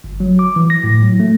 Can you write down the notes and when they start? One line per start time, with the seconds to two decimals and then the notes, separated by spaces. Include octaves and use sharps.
0.04 G1
0.20 F#3
0.39 D6
0.56 E3
0.70 A#6
0.84 A2
1.03 F#3
1.20 A3